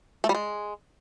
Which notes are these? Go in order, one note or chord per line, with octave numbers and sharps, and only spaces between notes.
A3
G3
G#3